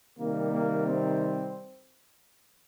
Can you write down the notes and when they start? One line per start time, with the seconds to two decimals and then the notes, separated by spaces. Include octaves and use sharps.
0.17 C3 D#3 G3 A#3
0.52 A#3
0.86 C4